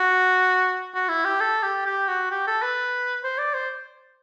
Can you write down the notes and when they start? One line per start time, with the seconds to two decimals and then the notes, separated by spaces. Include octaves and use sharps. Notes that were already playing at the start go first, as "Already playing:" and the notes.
Already playing: F#4
0.94 F#4
1.09 E4
1.25 G4
1.40 A4
1.63 G4
1.86 G4
2.08 F#4
2.31 G4
2.47 A4
2.62 B4
3.24 C5
3.38 D5
3.54 C5